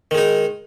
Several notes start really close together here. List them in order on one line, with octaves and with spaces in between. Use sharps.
D#3 G#3 D#4